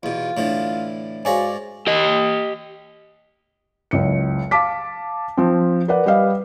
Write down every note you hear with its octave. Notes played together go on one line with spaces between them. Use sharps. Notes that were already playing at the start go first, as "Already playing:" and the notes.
E2 B2 F4
A2 D3 E3
G#2 F#4 C#5 D5 F5 G#5 A#5
G4 D#5
F#1 C#2 C#7
F5 A5 D6 B6
F3 C4
A#4 B4 D5 F#5
G3 B4 D#5 F5